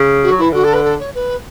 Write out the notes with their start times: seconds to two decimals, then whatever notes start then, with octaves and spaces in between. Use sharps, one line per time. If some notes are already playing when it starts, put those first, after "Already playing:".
Already playing: C#3
0.23 F#4
0.31 F#3
0.38 E3 E4
0.53 D3 F#4
0.64 A4
0.73 B4
0.84 A4
0.99 C#5
1.14 B4